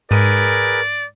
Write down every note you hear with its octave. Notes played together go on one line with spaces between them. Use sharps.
G#2 G#4 A#4 B4 D5 D#7